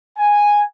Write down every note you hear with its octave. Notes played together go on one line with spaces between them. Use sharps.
G#5